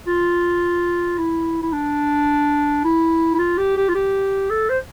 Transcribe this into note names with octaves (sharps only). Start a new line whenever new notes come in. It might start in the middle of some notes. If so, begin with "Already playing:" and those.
F4
E4
E4
D4
E4
E4
F4
G4
G4
F4
G4
A4
C5